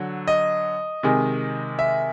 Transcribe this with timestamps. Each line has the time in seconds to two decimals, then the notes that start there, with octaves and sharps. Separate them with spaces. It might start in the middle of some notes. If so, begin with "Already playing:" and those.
Already playing: D3 F#3
0.28 D#5
1.03 C3 D#3 G#3
1.79 E5